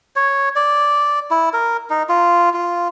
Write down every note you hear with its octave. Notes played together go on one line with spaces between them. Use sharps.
C#5
D5
E4
A#4
D#4
F4
F4